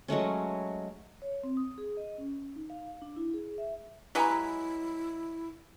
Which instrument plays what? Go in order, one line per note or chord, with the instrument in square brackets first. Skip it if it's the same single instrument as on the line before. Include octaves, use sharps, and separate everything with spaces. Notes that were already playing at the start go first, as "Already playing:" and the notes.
[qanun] F#3 G#3 A3 C#4
[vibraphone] C#5
C4
D#6
G#4
D#5
C#4
D#4
F5
D4
E4
G#4
E5
[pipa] F#3 G#3 B4 [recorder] E4 [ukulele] G4 G#5 A#5